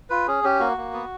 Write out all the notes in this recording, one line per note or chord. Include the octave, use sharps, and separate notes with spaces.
F4 B4
C#4 G#4
C#4 G4
A#3 F#4
A#3
B3